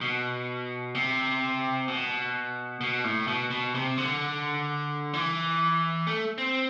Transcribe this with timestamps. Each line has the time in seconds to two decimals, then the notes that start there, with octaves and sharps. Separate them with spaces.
0.01 B2
0.95 C3
1.88 B2
2.81 B2
3.04 A2
3.27 B2
3.50 B2
3.74 C3
3.98 D3
5.13 E3
6.07 A3
6.38 C4